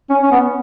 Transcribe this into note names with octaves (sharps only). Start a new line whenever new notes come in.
C#4
C#4
B3